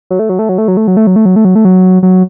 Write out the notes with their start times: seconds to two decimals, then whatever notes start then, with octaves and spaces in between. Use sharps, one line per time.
0.10 F#3
0.19 A3
0.29 F#3
0.39 A3
0.49 F#3
0.58 A3
0.68 F#3
0.77 A3
0.87 F#3
0.97 A3
1.07 F#3
1.16 A3
1.25 F#3
1.36 A3
1.45 F#3
1.55 A3
1.65 F#3
2.03 F#3